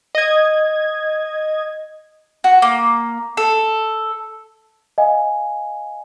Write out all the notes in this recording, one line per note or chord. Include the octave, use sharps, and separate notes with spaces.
D#5 G#6
F#4
A#3
A4
D#5 F5 G#5